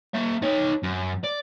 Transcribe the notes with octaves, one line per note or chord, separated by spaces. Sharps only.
A#3 E5
D#4 C#5
F#2
D5